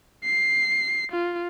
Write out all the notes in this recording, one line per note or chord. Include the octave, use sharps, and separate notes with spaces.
C7
F4